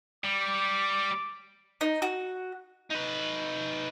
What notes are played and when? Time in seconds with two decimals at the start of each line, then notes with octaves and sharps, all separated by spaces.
0.25 G3 D6
1.81 D#4
2.02 F#4
2.90 D#4 B4